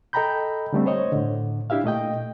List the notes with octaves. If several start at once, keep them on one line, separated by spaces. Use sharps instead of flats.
A4 D#5 G5 A#5 B5 G6
D3 G3 A3 C4
C5 C#5 D#5
A2 D3
D4 E4 G4 E5 F5
A#2 A3 D#5 G5